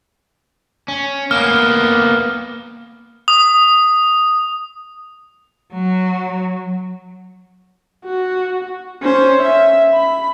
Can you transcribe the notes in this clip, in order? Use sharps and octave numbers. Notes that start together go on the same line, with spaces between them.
C#4
A#3 B3 F6
D#6
F#3
F#4
C#4 C5
E5
B5